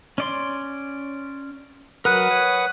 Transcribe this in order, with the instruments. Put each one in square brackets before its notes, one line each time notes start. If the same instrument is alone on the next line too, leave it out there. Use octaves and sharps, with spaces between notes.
[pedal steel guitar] C#4 D5 C6
[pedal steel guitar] F#3 A#4 [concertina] B4 F#5 D#6
[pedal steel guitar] C#5